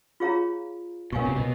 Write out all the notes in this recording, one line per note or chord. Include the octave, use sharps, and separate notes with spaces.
F4 G#4 C#5 F5 A#5
B2 A#4 C#5 F5 G#5 C#6
C3
B2